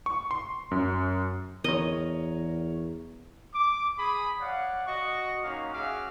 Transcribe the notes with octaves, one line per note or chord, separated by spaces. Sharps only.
C#6
C6
F#2
E2 A#4 C#5 D#5
D6
G#4 B5 D#6
C#5 D5 F5 F#5
F#4 D#5 C#6
A#3 C#4 D#4 F4 F#4 F5
C#4 F#4 G#4 E5 F5 D6